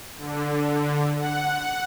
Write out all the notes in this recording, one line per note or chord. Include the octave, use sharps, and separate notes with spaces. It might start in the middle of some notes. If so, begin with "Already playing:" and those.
D3
F#5